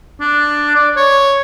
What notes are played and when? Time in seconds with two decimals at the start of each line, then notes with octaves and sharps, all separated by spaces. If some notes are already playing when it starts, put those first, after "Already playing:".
0.20 D4
0.75 D5
0.97 C#5